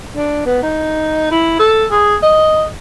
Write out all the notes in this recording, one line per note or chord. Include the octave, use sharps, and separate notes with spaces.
D4
B3
D#4
E4
A4
G#4
D#5